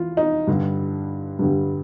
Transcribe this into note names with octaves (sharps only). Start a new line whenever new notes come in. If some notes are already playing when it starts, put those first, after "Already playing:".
Already playing: E3 F4
D#4
G2 D3 G3
G2 D3 G3